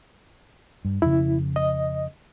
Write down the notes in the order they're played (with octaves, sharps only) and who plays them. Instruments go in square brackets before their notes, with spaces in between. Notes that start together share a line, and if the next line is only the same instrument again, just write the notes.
[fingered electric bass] G2
[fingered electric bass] F2 C#3 [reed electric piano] E4
[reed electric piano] D#5